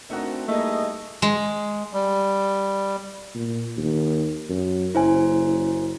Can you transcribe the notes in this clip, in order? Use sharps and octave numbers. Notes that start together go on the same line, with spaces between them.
A3 C4 D4 D#4 F#4 A#4
G3 A3 A#3 D#4 E4 G#4 D#5
G#3
G3
A#2
D#2
F#2
F#1 E4 C5 G#5